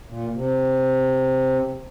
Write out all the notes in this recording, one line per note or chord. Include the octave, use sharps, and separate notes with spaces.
A#2
C3